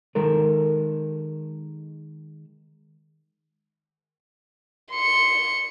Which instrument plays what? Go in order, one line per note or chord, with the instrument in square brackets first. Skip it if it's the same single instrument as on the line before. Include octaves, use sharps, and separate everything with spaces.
[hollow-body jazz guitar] D#3 G#3 A4 A#4
[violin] C6 C#7